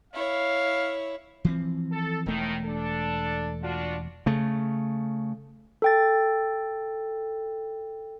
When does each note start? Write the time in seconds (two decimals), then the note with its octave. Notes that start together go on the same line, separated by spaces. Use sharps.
0.13 E4 C#5 F5
1.45 E3 F3 C4
1.91 A4
2.26 E1 A2 D#3 A3
2.64 D4 A4
3.62 D4 F4 F#4
4.26 C#3 A3
5.82 A4 G5 A6